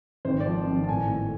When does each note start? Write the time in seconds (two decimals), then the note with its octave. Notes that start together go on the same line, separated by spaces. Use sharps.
0.25 G#1 C5
0.40 D5
0.46 F3
0.67 G#1
0.84 A5
0.88 A2 G#5
1.09 A3